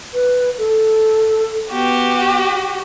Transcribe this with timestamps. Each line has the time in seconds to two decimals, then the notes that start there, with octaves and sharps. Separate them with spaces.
0.14 B4
0.58 A4
1.71 B3 F#4 G4